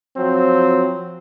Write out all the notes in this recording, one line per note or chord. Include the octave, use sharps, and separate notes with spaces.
F3 F#3 C4